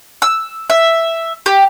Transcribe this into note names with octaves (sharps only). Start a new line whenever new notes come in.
E6
E5
G4